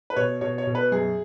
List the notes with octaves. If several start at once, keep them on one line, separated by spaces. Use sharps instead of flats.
B4
B2 C#5
B2 C#5
C#5
B2
B4
F#2 G#4